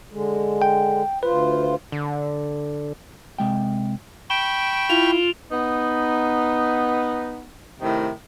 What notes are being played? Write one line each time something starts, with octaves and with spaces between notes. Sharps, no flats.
D3 G#3
G5
D2 F4 B4 C5
D3
C3 G#3 G5
G5 B5 C#6 D7 E7 G7
E4 F4 F7
B3 D#4
A2 C3 D#3